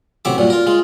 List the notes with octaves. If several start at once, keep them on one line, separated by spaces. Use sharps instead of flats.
A1 C3 F#3 E5 D6
G2 A#2 F#3
F4 A#4
G#3 F4